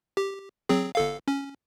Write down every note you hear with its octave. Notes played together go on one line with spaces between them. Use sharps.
G4
F#3 C4 G#4
G1 A4 F5
C#4